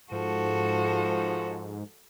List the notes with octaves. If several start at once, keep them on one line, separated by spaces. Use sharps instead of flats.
G#2 F3 F#4 A4